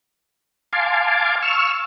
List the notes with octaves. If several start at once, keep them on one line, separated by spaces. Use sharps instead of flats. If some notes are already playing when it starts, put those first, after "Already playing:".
F5 G#5 A5 C6 D6
C#6 E6 F6